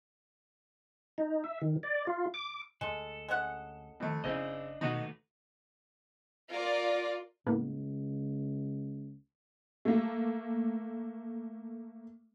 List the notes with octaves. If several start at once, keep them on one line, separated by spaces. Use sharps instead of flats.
D#4
E5
D#3
D5
F4
D6
D2 G#3 A4
G#3 C#4 F#5
F2 D#3 A3
F#1 C#3 C4 D4 E4 D#5
D#2 B2 A3 D#4 F#4 B4
F4 A#4 D5
C#2 A2 A#3 B3
A3 A#3